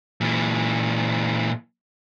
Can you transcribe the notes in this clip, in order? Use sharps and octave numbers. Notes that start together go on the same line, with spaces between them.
A#2 E3